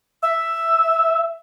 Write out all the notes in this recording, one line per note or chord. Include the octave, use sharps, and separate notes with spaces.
E5 E6